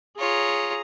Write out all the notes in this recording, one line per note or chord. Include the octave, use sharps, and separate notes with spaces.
F4 G#4 C#5 A#5